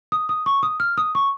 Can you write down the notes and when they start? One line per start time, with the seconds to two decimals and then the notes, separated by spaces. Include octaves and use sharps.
0.12 D#6
0.29 D#6
0.46 C#6
0.63 D#6
0.80 F6
0.98 D#6
1.15 C#6